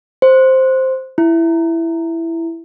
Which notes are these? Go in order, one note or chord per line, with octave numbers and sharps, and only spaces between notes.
C5
E4